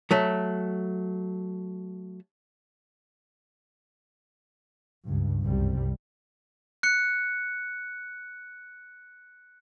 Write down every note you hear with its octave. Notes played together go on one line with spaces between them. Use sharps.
F#3 A3
C#2 G2
C2 F#2 C3 G3
F#6 C#7